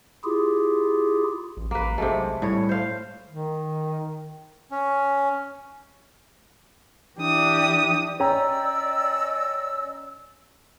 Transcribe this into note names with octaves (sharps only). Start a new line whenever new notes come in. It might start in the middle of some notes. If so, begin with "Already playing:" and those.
E4 F4 G4 G#4
A1
A1 A#3 B4
B1 C3 G#3 A3
A2 G3 C#5
C5 F5
D#3
C#4
E3 D4 G4 D#6
C#4 D5 D#5 G5 A#5 E6